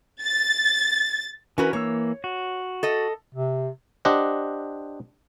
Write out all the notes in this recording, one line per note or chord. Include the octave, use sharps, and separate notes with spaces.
A6
E3 C#4 F#4 A#4 B4
E3 A#3 C#5 E6
F#4
A4 D#5
C3
D4 G4 C5 D#5 F#5